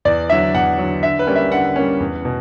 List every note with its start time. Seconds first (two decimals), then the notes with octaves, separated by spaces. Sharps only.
0.05 E2 D5
0.30 D3 F#3 E5
0.54 E2 F#5
0.78 D3 F#3
1.03 D3 E5
1.19 B4
1.27 G3 A#3 C#4
1.35 E5
1.52 D3 F#5
1.76 G3 A#3 C#4
2.00 E2
2.25 B2